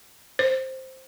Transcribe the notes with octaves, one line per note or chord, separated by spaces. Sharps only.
C5